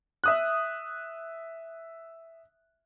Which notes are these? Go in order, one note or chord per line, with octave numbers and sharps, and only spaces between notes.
E5 D#6 F#6